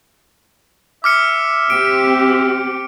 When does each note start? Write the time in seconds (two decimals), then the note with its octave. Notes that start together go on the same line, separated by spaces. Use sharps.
1.04 E5 D6 F6 C#7
1.70 C4 G4 D7